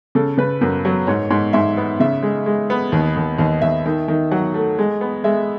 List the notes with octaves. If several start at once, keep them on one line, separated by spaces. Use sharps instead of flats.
C#3 A4
C#3 B4
F#2
F#3
G#2 C#5
G#2
G#2 E5
B3
C#3 E5
G#3
G#3
B3
D#2
D#2
D#2 D#5
D#2 E5
D#3
D#3
F#3 F#5
A3
G#3
B3
G#3 E5